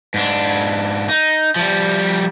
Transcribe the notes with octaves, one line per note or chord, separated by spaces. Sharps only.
G#2 D4
D#4
F3 G3